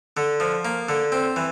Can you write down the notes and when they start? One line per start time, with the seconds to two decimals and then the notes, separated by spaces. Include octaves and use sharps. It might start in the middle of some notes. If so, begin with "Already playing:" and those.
0.17 D3
0.40 F3
0.65 A#3
0.89 D3
1.12 C4
1.36 E3